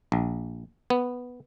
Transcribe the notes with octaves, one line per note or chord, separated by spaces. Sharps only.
A#1
B3